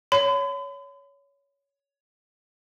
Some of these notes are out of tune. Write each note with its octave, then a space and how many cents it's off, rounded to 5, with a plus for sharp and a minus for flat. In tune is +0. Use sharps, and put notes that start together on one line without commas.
C#5 +15 B5 +45